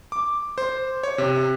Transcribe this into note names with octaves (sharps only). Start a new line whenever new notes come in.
D6
C5
C#5
C3